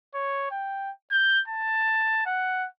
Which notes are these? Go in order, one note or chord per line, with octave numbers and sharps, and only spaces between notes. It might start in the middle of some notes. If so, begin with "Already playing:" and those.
C#5
G5
G6
A5
F#5